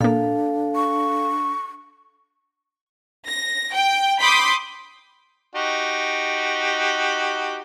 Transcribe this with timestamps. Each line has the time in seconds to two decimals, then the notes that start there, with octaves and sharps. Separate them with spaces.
0.01 A#2 A#3 D4 A4 F5
0.75 C#6
3.27 A#6
3.73 G5
4.20 B5 C6 D6 D#6 G6 B6
5.55 D#4 F#4 G4